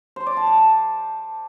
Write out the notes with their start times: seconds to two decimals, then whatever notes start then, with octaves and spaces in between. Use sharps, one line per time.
0.16 C5
0.26 D5
0.37 A5
0.47 A5
0.57 A5